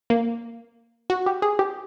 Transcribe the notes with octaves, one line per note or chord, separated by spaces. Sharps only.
A#3
F#4
G4
G#4
G4